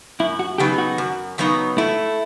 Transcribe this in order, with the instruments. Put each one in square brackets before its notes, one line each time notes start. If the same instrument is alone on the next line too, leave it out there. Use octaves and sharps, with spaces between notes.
[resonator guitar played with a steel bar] F#2 [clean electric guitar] E4
[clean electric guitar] F#4
[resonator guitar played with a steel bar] C#3 F#3 B3 D#4 [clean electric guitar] G4
[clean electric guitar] F#4
[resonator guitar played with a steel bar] F#2
C#3 F#3 B3 D#4
[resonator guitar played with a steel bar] A3 [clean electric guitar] E4